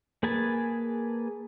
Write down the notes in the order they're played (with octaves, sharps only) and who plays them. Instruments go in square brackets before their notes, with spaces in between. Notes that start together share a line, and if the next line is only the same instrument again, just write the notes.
[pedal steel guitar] A#3 G#4 B4 G#5 A5